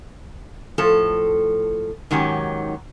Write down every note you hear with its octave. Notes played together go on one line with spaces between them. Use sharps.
A2 F3 A4
G#2 D#3 F#3 C#4 G4